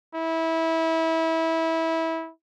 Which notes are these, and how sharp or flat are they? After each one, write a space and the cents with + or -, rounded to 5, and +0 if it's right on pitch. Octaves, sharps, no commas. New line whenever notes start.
E4 -20